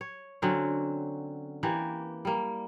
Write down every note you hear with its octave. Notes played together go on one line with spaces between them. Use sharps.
C#5
D3 F#3 C4 C#4
E3 A#3 G4
G3 A#3